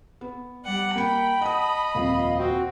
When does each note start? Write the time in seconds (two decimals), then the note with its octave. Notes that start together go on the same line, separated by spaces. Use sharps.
0.21 B3
0.65 G3 D5 F#5
0.96 A#3 G5 B5 C#7
1.42 D#5 F#5 A5 D#6
1.95 D#1 F2 F5
2.38 C4 F#4